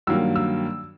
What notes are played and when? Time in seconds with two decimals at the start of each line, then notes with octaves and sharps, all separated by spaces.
0.07 G2 D#3 F#3 A#3 E6
0.36 E6